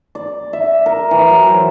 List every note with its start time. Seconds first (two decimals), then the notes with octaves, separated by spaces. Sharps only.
0.15 D5
0.53 E5
0.86 A#4
1.11 E3
1.30 F#3
1.49 C5